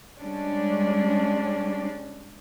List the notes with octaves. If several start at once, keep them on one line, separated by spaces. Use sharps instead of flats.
G3 G#3 C#4 D4